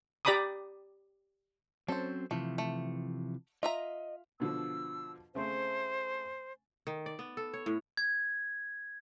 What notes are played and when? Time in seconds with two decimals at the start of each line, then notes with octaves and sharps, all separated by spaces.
0.25 G4 D5 A#5 B5 D6 D#6
1.88 F#3 C4 C#4 A4 C5
2.31 C3 E3 F3 A3
2.58 A3
3.63 F4 D#5 E5 A#5
4.40 B2 D3 F3 E6
5.35 C#3 A3 C4 C5
6.87 D#3
7.06 D5
7.19 B3
7.37 A4
7.54 C#5
7.66 A2
7.97 G#6